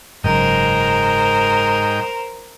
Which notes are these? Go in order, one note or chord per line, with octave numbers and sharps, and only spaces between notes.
F#1 G#2 A#4 C5 D#5 G5